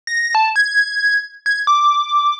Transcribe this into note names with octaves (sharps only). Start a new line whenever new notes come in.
A#6
A5
G#6
G#6
D6